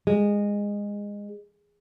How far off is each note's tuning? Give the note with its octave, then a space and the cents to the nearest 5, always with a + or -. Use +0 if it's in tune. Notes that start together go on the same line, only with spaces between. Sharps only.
G#3 -20